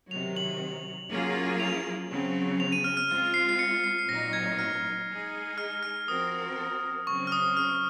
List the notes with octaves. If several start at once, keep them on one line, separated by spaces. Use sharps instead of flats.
C3 D#3 F#3 F7
F#7
F#3 A#3 C#4 F4 G#4
F7
C#3 F#3 C4
F7
D#7
F6
F6
G#3 C4 F4
C7
C7
C#7
C7
C7
A#2 F#3 C4 D#4 A#6
G#6
F6
G#3 D#4 G#4
F6
F6
F3 C4 F#4 A#4 D#6
C#3 F#3 C4 C#6
F6
D#6
F6